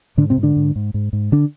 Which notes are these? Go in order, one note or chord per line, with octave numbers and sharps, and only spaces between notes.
G#2 D3 D4
C3 C4
G#2
D3 D4
G#2
G#2
G#2
G#2
D3 D4